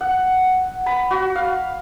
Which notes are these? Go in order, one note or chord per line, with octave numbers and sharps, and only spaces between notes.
F#5
B5
F#4
F5